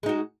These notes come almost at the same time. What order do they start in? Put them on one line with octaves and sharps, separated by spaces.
G#3 D#4 F#4